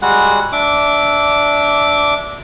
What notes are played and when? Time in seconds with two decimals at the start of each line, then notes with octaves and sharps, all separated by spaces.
0.02 G3 G#3 F#4 F#5
0.52 D4 E5 D6